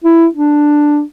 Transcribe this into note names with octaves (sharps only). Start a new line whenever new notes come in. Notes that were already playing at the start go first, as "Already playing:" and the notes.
E4
D4